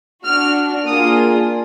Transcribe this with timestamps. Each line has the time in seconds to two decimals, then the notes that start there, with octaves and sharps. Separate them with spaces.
0.24 D4 F#4 F6
0.86 A#3 D4 F4 G#4 D#6